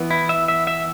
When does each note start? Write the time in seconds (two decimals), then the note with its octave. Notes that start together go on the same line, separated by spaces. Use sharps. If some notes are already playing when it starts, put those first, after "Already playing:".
Already playing: E3 B3
0.11 E4
0.29 E5
0.48 E5
0.67 E5